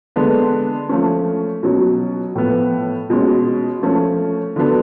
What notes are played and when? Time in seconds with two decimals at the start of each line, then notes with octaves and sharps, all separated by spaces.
0.16 D3 G#3 B3 D4
0.89 F3 A3 C#4
1.63 B2 F#3 C#4
2.35 A2 F3 B3
3.10 B2 G#3 C#4
3.82 F3 A3 C#4
4.56 D3 F#3 B3 D4